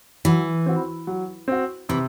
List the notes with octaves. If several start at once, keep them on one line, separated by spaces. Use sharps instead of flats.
E3 F#3
C4 F#4
F#3
C4 F#4
C3 E3